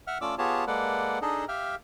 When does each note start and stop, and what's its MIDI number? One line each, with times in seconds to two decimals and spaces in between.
0.07 0.18 76
0.07 0.18 78
0.07 0.18 89
0.21 0.35 57
0.21 0.35 61
0.21 0.35 65
0.21 0.35 74
0.21 0.35 86
0.21 0.35 88
0.38 0.65 59
0.38 0.65 65
0.38 0.65 67
0.38 0.65 68
0.38 0.65 73
0.38 0.65 81
0.67 1.19 56
0.67 1.19 58
0.67 1.19 69
0.67 1.19 71
0.67 1.19 74
0.67 1.19 78
1.22 1.45 62
1.22 1.45 63
1.22 1.45 68
1.22 1.45 69
1.22 1.45 75
1.48 1.75 67
1.48 1.75 76
1.48 1.75 77
1.48 1.75 79
1.48 1.75 89